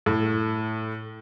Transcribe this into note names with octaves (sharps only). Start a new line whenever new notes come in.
A2